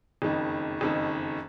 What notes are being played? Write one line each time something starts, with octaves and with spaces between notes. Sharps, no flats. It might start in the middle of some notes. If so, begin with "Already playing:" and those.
F#1 F2 D#3
F#1 F2 D#3